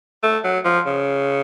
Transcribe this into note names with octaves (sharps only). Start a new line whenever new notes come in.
A3
F#3
F3
C#3